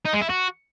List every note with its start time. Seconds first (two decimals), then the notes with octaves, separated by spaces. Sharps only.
0.05 D#4
0.13 G#3
0.21 E4
0.29 F#4